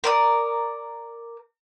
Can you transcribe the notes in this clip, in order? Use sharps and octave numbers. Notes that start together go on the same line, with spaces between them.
A#4 D5 D#6